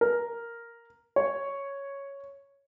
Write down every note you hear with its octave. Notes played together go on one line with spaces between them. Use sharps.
A#4
C#5